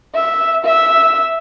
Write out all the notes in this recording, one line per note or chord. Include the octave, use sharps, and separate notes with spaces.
E5
E5